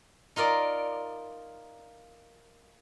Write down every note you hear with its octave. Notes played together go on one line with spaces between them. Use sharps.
D#4 F4 A#4 D5